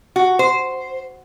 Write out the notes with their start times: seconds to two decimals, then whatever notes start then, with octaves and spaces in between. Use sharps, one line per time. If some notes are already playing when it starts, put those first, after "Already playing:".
0.16 F#4
0.39 C5